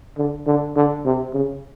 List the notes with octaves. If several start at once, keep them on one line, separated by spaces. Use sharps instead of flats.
D3
D3
D3
C3
C#3